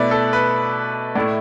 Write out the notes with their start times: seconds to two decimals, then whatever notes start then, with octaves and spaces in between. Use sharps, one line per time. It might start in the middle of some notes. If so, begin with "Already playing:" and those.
Already playing: B2 A3 E4 B4 D5
0.11 A4
0.33 B4
1.16 A2 A3 E4 D5